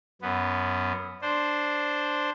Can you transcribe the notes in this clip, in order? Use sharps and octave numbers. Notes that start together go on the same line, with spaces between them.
F#2 B3
D4 C5